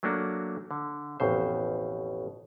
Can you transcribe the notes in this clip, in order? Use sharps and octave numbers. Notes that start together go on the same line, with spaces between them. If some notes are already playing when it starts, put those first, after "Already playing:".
F#3 A3 A#3 D4 F#4
D3
A1 F2 B2 C5